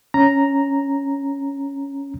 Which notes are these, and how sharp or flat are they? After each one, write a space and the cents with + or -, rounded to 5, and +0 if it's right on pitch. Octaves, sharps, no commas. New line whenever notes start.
C#4 +0 A#5 +0